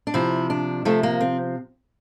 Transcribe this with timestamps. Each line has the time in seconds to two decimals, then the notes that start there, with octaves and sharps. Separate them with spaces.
0.07 D4
0.14 C3 F3 E4
0.50 D4
0.85 C3 F3 A3
1.03 A#3
1.21 C4